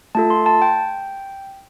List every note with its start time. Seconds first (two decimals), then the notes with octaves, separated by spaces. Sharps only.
0.15 A3 F4 A4 A5
0.30 C6
0.46 A5
0.62 G5